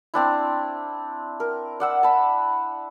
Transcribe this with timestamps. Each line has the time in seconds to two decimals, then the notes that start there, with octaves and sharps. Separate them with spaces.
0.14 C4 D4 E4
1.40 A#4
1.80 D5 F#5 E6
2.03 A5 B5